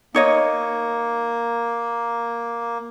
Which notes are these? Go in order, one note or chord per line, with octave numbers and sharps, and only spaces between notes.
A#3 D#4 C#5 D#5